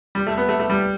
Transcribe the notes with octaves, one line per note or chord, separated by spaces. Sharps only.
G3
A3
B3
A3
A3
G3